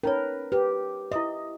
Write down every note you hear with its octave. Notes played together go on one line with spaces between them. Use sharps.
C#4 D#4 A#4 B4 C#5
G4 B4
E4 D#5 E5